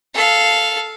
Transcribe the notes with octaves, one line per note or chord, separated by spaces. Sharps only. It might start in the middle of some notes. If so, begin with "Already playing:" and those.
A4 F5